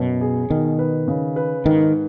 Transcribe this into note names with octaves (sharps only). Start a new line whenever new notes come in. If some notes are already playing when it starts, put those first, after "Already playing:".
Already playing: F#2 B2
G#4
B2 D#3
B4
C#3
B4
G#2 D#3